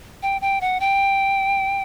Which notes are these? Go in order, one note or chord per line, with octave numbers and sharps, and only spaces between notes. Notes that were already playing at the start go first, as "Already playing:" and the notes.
G5
G5
F#5
G5